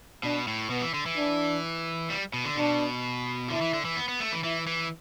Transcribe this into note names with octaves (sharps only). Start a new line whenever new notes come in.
B2 D4
A2
B2 B3
E3
D3
E3
D4
G3
B2
D3
B2 D4
D3 E4
E3
D3
E3
B3
B3
A3
E3
E3 E4
E3